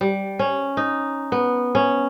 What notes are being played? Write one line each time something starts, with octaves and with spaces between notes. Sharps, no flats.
G3
C#4
D#4
B3
C#4